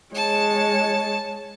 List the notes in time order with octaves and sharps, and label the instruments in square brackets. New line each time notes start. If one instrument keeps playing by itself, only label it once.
[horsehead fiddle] G#3 C#5 [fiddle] A5